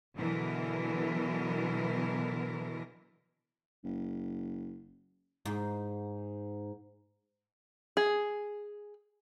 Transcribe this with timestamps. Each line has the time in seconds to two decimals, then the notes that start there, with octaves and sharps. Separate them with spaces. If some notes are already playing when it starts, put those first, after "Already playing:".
0.16 B2 D3 E3 F#3 B3 A#4
3.84 F#1
5.46 G#2
7.97 G#4